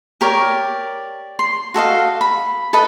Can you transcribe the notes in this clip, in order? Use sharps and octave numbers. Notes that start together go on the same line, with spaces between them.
G4 A#4 C#5 D5
C6
F#4 A4 D#5 F5
B5
A4 B4 D#5 B5